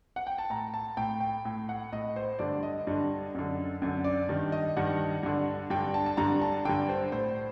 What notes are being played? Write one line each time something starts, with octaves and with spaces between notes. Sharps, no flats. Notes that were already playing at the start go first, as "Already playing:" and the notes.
F#5
G5
A5
A2 A#5
A5
A2 G5
G5
A2
F#5
A2 D#5
C5
G2 D3 D5
D#5
G2 D3
F#2 D3
F#2 D3
D5
G2 D#3
D#5
G2 D#3 F#5
G2 D3
G2 D3 G5
A5
A5
G2 D3 A#5
A5
G2 D3 G5
C5
A2 C5